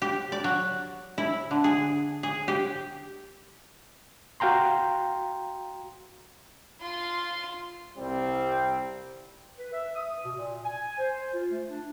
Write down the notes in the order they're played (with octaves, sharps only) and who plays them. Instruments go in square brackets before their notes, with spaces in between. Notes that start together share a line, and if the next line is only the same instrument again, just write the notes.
[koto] G4
D5
F#3
E4
D3
G#4
G#4
G4
[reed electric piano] F#4 F5 G5 A#5 C6
[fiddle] F4 C6
[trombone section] C2 G3 C4
[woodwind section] B4
E5
D#6
B2
A#2
G#5
C5
F4
A3
D4